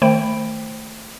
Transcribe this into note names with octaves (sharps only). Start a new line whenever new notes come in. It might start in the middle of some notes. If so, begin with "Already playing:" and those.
D#3 A3 C5 G5 B5 D7